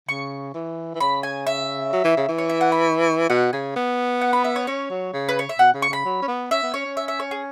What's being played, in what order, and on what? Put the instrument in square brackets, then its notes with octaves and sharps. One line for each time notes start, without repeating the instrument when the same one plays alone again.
[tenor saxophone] C#3 [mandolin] C#6
[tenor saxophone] E3
E3
[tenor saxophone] C#3 [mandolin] B5
[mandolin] G#5
E5
[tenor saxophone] F#3
E3
C#3
E3
[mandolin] C#5
E5
F#5
B5
[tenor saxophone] B2 [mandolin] F#5
[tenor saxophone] C#3 [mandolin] G#5
[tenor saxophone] B3
[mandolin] F#5
B5
E5
C#5
[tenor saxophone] C#4 [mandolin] C#5
[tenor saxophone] F#3
C#3
[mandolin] B4
C#5
E5
[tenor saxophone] B2 [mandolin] F#5
[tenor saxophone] C#3
[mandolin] C#6
[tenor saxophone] C#3 [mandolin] B5
[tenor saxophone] F#3
C#4
B3
[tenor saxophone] C#4 [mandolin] E5
[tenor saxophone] B3
[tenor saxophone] C#4 [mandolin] C#5
[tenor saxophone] C#4
[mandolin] E5
E5
C#5
G#4